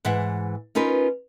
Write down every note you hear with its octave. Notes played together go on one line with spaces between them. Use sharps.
G#2 E3 E5 F#5
C#4 D#4 F4 A#4 B4